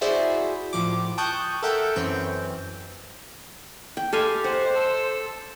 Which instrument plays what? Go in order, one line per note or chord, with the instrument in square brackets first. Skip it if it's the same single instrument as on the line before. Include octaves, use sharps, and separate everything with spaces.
[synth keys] E4 F#4 G#4 C5 D5 E5
A2 F3 D6
G5 A5 C#6 D#6 F#6 G6
A4 A#4 E5 F#5 G5 G6
F#2 E3 C4 C#4 G5
[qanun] G5
[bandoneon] G#3 G4 [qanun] A4 F5 G#5
[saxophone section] C5 [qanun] F#5
[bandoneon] A4 E6